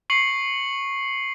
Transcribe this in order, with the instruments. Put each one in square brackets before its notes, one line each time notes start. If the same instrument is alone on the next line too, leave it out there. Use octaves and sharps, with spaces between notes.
[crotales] C#6 C7 C#7 F#7